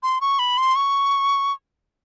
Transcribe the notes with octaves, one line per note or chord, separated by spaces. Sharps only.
C6
C#6
B5
C6
C#6